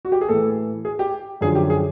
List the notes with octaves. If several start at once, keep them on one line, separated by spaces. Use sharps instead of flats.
F#4
G4
G#4
A2 E3 A4
G#4
G4
F#2 D3 F3 G#4
G4
G#4